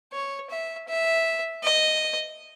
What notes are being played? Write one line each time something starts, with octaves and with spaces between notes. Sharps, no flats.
C#5
E5
E5
D#5